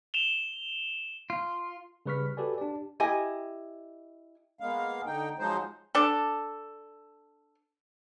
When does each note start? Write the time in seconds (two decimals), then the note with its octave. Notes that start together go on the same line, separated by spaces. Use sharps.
0.14 E7 F7 G7
1.30 F4
2.06 C#3 G3 B4 C#6 F6 B6
2.37 F#4 G4 A4 B4 D5 G#5
2.58 D4 G4 D5
3.00 E4 G4 D#5 G#5
4.60 G#3 A#3 B3 F5
5.06 D3 D#4 G5
5.39 F3 F#3 G#3 D#4 C5
5.95 D4 A4